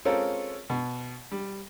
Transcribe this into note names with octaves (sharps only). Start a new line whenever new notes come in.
G#3 C4 C#4 F4 A4 A#4
B2
G3